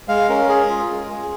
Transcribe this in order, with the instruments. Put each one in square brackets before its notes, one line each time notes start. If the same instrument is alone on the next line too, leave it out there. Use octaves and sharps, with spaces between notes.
[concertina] G#3 F5
C#4 A#4
G#4
F4
G#3
G#4